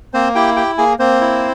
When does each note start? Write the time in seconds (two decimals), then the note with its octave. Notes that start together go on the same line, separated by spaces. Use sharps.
0.14 A#3 C4 C5
0.35 E4 G4 G5
0.56 G4 G5
0.78 A#3 G#4 G#5
0.99 A#3 C4 C5
1.21 E4